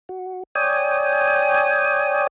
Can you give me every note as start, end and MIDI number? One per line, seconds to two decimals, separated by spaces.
0.09 0.43 66
0.55 2.27 73
0.55 2.27 74
0.55 2.27 79
0.55 2.27 80
0.55 2.27 87